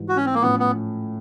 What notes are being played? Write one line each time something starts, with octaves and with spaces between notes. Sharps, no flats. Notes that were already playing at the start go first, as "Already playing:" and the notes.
Already playing: G#2 E3 G3
F#4
C#4
C4
A#3
A2 F3 A3 B3 C#4
B3